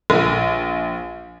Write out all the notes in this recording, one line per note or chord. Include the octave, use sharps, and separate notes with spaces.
A#1